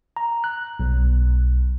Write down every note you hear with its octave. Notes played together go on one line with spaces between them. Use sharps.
A#5
F#6
B1